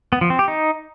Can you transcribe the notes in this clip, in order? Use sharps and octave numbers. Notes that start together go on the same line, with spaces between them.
B3
F3
C4
G4
D#4